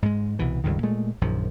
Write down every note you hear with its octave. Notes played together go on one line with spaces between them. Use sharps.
G#2 G#3
C2 B2 E3
C#2 G2 D#3
A#2 G#3 A3
A#1 F#2 D#3 F3